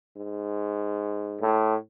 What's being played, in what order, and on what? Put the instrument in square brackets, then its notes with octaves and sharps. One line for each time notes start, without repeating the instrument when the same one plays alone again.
[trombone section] G#2
A2